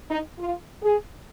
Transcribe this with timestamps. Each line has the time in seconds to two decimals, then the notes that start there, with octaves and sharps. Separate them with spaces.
0.09 D#4
0.38 F4
0.82 G#4